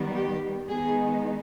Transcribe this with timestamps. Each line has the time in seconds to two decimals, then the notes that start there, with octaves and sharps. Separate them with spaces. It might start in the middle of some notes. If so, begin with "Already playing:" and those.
Already playing: D#3 G3 B3
0.15 G4
0.68 D#3 G#3 B3 D#4 G#4